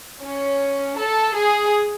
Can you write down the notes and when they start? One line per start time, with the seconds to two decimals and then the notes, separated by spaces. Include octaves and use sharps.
0.22 C#4
0.97 A4
1.34 G#4